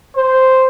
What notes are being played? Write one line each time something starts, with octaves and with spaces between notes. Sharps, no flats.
C5